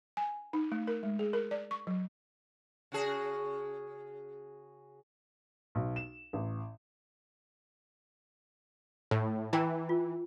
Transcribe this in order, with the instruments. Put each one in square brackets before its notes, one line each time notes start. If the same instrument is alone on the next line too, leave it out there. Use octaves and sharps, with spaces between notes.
[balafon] G#5
D#4
A3
A#4
G#3
G#4
A#4
D5
C#6
F#3
[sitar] C#3 F#4 G#4
[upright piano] B1
E7
A1
[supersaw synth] A2
[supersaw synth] E3 [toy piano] G5 A#5
[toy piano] F4